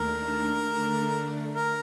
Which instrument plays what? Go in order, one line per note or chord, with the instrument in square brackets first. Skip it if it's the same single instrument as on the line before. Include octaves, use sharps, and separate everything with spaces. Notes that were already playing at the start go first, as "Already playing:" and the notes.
Already playing: [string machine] D#2 D#3 A3 D4 [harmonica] A#4
[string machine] D3 A3 D4
[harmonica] A#4